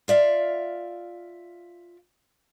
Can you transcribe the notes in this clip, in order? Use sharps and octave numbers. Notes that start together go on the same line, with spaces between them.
F4 D5 E5 F5